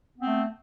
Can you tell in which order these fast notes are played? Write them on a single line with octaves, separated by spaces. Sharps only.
B3 C4 A3